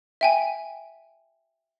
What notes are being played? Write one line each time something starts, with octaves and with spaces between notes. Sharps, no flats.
E5 G5 G#5